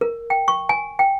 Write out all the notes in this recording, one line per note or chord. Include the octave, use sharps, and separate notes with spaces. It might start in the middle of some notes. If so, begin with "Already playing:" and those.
A#4
G5
C#6
G#5
G5